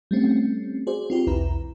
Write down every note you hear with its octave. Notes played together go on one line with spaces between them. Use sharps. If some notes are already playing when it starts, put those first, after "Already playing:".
G3 A3 C4 C#4
F#4 G#4 C5 D5
C4 F4 G4
B1 E2 E4 B4 A#5